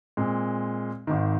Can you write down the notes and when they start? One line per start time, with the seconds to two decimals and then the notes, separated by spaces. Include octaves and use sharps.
0.17 A#2 G#3 C4
1.07 G#1 G#2 D#3